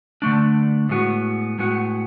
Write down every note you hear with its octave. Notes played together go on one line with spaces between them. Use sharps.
D3 A3 D4
A2 G#3 B3 F#4
A2 G#3 B3 F#4